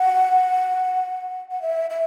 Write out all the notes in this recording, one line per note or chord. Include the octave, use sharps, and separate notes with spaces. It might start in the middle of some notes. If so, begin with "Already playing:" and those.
Already playing: F#5
F#5
E5
E5